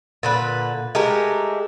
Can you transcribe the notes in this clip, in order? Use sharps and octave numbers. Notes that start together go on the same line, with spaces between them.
A#2 D3 B4
G#3 A3 G4 A#4